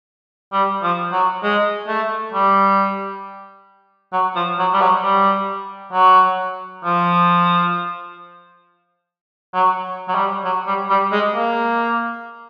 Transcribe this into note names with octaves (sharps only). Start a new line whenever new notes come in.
G3
F3
F#3
G#3
A3
G3
F#3
F3
F#3
G3
F#3
G3
F#3
F3
F#3
F#3
G3
F#3
G3
G3
G#3
A#3